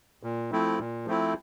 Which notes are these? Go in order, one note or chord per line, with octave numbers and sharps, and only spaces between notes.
A#2
F3 A3 C4 E4
A#2
F3 A3 C4 E4